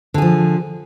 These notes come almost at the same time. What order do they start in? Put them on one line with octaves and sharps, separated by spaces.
D3 G#4 F3